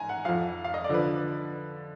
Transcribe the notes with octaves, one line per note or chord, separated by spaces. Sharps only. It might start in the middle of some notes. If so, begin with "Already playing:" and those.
Already playing: G#2 G#5 A#5
F#5
F2 F3 F5
F5
D#5
D5
D3 F3 B4